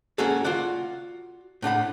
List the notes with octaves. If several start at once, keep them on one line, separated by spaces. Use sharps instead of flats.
A#3 C#4 F#4 G#4 A4
F4 F#4 D5 F#5
A2 D4 F#5 B5